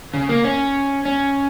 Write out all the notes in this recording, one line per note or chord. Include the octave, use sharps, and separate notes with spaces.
C#3
A#3
C#4
C#4